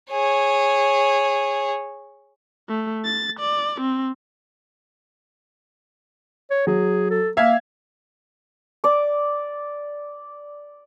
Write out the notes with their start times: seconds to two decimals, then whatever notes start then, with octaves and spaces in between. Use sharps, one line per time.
0.10 G#4 C#5
2.69 A3
3.05 A6
3.39 D5
3.81 C4
6.51 C#5
6.67 F#3 G#4
7.10 A4
7.37 A#3 E5 F5 G#6
8.84 D5 D6